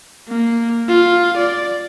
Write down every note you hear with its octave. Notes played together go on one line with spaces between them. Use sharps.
A#3
F4
D5